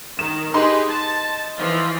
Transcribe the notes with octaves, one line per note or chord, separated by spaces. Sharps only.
D#3 E7
D#4 G4 G#4 B4 C6
A5
E3 F3 F4